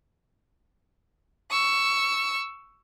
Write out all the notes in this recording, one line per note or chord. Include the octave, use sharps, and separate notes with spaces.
C#6 E6